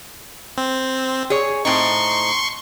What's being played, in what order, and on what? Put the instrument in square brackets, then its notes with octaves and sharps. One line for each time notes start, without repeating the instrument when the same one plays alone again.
[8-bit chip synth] C4
[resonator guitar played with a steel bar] G#4 C#5
[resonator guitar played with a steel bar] A2 C4 D#4 [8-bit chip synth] C6 C#6